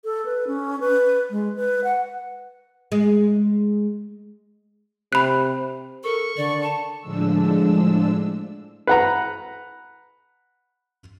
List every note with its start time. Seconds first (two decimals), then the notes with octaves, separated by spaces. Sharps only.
0.05 A4
0.26 B4
0.47 C#4
0.81 B4
1.31 G#3
1.56 B4
1.84 F#5
2.92 G#3
5.13 C3 B5 F#6
6.04 A4 A#4 C#6
6.37 D3 D5
6.62 A5
7.00 A2 D3 F3 G#3 D4 E6
8.87 B4 F#5 A#5